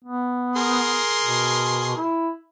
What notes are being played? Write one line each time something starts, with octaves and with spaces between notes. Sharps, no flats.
B3
G#4 A#4 C6
B2
E4